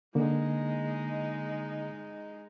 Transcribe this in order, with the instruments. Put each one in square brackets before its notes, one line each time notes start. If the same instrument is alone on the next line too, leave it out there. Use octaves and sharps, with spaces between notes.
[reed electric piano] D3 A#3 [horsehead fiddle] G#3 D#4